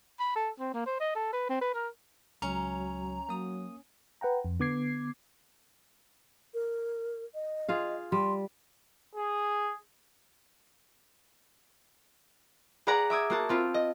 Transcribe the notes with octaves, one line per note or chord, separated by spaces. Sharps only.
B5
A4
C4
A#3
C5
D#5
A4
B4
C4
B4
A#4
C#2 F#3 C#4 A#5
F#3 A#3 D#6
B4 F#5 G5 A#5
F2
D3 B3 D6 G#6 C7
A#4
D#5
F4 G#4 F5
G3 C6
G#4
G#4 B4 D5 F#5 A#5
E5 D6 D#6 G#6
A#3 F#4 A5
C4 F4 B4
D#5